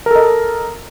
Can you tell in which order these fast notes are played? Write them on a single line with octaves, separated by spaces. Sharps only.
A#4 A4 D#5